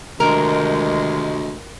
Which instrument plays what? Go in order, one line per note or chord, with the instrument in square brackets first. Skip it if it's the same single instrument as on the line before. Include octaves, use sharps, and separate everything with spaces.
[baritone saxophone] D2 [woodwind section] C3 D#3 G#3 [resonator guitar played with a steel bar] A#4